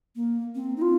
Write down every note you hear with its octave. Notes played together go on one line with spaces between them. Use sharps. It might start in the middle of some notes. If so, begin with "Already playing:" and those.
A#3
C4
D#4
F4